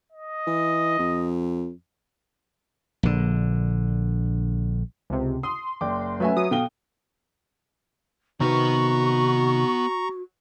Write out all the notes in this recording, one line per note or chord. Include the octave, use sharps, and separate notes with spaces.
D#5
E3
F2
A#1 D3
C#2 C3
C6 D#6
F#1 D5 G5 D6
F#3 A3 C#4 B4 E5 G#5
F#3 D#6
B2 A4 F5 G5 G7
C3 D#3 B3 D#4 F#4 B4 A#5 C#6